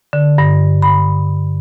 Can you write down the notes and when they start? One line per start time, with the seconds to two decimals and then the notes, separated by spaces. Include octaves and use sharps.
0.13 D3
0.38 G2
0.82 B5